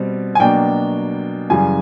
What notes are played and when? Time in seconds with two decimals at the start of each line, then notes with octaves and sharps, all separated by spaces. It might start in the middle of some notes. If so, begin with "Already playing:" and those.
Already playing: B2 G3 C4
0.35 G#5
0.40 B2 F#3 A#3 D4 G5
1.50 F#2 C#3 E3 G3 G#5